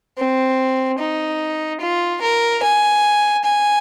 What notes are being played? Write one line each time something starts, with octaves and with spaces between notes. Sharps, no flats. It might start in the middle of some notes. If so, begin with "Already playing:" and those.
C4
D#4
F4
A#4
G#5
G#5